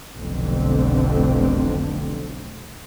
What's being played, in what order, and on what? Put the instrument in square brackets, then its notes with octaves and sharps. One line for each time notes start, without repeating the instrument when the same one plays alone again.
[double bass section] F1 B1 F2 D3 C4